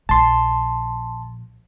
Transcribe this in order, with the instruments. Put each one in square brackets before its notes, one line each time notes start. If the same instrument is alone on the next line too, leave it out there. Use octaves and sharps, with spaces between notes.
[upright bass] A#1 [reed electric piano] A5 C6